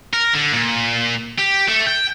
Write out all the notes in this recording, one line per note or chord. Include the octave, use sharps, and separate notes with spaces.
A#4
D3
A#2
G4
A3
G5